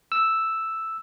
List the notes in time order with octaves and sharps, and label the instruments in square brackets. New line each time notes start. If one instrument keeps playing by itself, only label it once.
[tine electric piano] E6